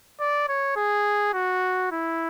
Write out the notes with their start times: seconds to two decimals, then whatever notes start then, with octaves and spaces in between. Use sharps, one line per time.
0.21 D5
0.49 C#5
0.77 G#4
1.34 F#4
1.92 E4